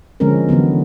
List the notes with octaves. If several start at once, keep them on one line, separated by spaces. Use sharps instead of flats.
D3 F3 G#3 C4 C#4 A#4
D3 E3 F#3 B3